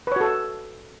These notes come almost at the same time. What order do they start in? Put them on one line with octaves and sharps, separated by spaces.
B4 C#5 F#4 A4